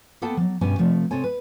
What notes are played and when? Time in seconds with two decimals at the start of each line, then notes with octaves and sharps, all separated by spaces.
0.22 A#3 B3 A4 F#5 G5 A5
0.37 F3 F#3
0.61 G2 B2 B3 C#4 G4 G#5
0.78 C3 F3 A3 C4
1.11 C3 G#3 C4 A4 C#5 G#5
1.24 B4